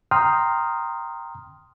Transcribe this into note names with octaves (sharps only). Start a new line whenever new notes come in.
G5 A#5 C6 D#6 F6